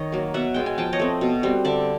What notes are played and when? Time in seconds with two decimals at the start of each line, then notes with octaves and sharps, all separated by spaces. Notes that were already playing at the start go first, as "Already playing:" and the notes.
Already playing: D#3 C#5 D#5
0.12 F#3 A#3
0.34 B2 E5 F#5
0.54 G#3 B3 G5
0.66 G#5
0.78 F3 G5 A5
0.93 C#5 D#5
0.99 A3 C4
1.21 B2
1.43 G3 C4
1.65 D3 D5 E5